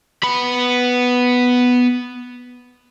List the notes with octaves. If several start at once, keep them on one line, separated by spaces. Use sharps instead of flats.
B3 B5